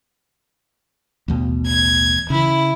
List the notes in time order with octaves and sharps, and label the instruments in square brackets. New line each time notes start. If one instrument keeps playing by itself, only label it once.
[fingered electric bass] A1 D#2 B2
[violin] G#6
[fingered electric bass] C#3 E3 [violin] E4